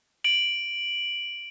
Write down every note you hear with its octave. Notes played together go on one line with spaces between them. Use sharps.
D7 F#7